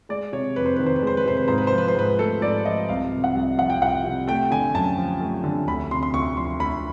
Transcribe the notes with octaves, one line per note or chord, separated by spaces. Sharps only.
G#3 D5
C3 C#5
F2 B4
C5
D#3 B4
C5
B4
G#3 C5
B4
C3 C5
B4
G#2 C5
B4
C5
F3
B4
C5
G#2 B4
A3 A4
G#2 D5
F3 D#5
C2 F5
C3
F#5
C2
F3 F#5
G5
C2 F#5
C3
A3 G5
D3 G#5
F#2 A5
F3
A3
D3
D2 B5
C3 C6
C6
D2 C#6
F3 C6
D2 B5